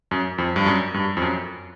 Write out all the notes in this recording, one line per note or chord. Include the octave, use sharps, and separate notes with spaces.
F#2
F2
G2
F#2
G2
F2
F#2